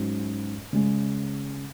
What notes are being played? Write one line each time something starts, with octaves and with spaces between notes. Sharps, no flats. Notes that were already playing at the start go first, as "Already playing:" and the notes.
Already playing: G#2 F#3 C#4
C#3 G#3